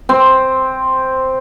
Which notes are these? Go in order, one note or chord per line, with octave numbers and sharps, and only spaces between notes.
C4